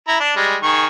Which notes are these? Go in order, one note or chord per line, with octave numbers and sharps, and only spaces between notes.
E4 A#5
D4
G3 G#3
D#3 G#4 C#6